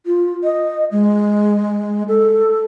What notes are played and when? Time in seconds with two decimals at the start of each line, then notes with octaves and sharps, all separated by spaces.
0.06 F4
0.44 D#5
0.92 G#3
2.08 A4